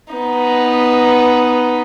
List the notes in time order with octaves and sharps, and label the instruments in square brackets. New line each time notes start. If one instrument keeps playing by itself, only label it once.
[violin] B3 D#4